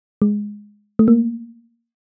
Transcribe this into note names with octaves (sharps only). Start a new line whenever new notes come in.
G#3
A3
A#3